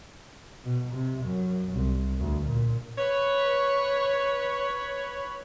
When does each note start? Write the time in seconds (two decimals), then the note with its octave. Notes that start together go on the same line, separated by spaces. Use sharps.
0.64 B2
0.93 C3
1.24 F#2
1.73 C2
2.18 D2
2.47 A#2
2.98 B4 C#5